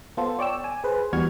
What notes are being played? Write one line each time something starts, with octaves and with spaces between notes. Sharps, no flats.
B3 F4 A4 C5
C#5 D5 G5 E6
G#5
G#4 B4 C5
E2 G3 F#4 C#6 F6 G#6